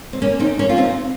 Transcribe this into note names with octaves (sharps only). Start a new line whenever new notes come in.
C4
A#3 C#4
C4 D#4
A#3 C#4
F4
C4 D#4